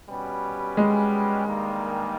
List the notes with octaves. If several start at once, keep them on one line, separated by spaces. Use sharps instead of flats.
B2 G3 C#4 G4 B4
G#3
G2 D#3 G3 A#3